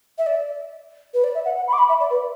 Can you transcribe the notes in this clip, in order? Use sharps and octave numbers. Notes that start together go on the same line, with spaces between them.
E5
D5
B4
D5
E5
F#5
F#5
B5
D6
B5
E5
D5
B4